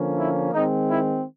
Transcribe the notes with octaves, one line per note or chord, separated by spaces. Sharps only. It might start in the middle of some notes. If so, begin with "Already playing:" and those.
Already playing: D3 F3 A#3 C#4
E4
D#3 G#3 C4 D#4
E4